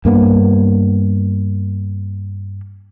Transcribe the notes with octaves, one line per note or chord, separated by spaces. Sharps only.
G2 A#3 B3